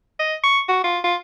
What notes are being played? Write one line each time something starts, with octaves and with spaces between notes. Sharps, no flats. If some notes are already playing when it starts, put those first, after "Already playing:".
D#5
C#6
F#4
F4
F4